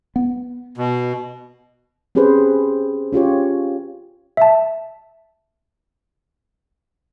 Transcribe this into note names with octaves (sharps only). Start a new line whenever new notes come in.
B3
B2
C4 C#4 G4 G#4 B4 C5
C#4 F4 G4 C#5
E5 A5